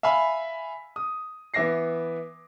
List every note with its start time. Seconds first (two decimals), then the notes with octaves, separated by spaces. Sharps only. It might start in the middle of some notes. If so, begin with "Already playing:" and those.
0.03 E5 F5 G#5 B5
0.96 D#6
1.54 E3 B3 E5 D6 A#6 C7